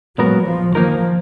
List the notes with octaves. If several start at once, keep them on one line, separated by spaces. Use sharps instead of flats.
A#2 F#3 G#3 B3 F#4 A#4
F3
D#2 D#3 F3 A#3 D#4 A#4